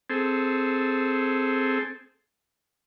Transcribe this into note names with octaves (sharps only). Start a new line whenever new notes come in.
C4 G#4 A4